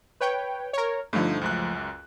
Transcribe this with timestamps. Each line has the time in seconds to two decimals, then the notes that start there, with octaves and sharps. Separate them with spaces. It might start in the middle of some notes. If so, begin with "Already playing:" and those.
0.21 B4 C#5 G5
0.73 A#4 C#5
1.13 G2 D3 F3 A3 D#4
1.41 C#2 F#2 F#6